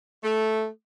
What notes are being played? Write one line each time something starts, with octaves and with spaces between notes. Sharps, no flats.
A3